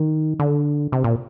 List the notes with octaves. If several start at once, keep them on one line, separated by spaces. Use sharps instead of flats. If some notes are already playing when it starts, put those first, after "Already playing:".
Already playing: D#3
D3
C3
A#2